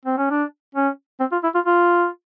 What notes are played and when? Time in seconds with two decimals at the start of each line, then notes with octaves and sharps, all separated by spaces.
0.05 C4
0.18 C#4
0.30 D4
0.75 C#4
1.20 C4
1.32 F4
1.44 E4
1.55 F4
1.66 F4